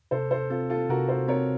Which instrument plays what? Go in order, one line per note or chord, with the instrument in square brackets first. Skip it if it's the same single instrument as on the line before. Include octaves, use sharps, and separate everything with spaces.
[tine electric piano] C3 [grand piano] A4 C5
[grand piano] A4 C5
[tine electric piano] C4 [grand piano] F4 A4
[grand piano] F4 A4
[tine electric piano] C3 [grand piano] F#4 A#4
[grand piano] A4 C5
[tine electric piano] C4 [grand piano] A#4 C#5